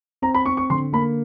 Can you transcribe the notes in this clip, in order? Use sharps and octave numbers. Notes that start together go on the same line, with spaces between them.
C4 A#5
B5
C4 C#6
C#6
D3 C6
A#3 B5